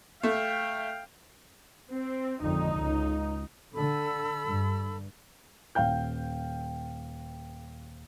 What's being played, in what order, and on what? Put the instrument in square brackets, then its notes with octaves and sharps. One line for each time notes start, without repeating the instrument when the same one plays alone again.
[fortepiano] A3 [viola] F5 G5
[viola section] C4
[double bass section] G#1 F2 D3 [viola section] D#4
[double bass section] C#2
[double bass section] D3 [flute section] A4 B5 E6
[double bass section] G2
[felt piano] D#1 F5 G5 G6